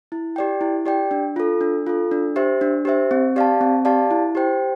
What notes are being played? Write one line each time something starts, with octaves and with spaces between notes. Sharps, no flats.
E4
G4 D5 G5
E4
G4 D5 G5
D4
F4 A4
D4
F4 A4
D4
G4 C5 E5
D4
G4 C5 E5
C4
G4 D5 F5 A5
C4
G4 D5 F5 A5
E4
G4 C5 G5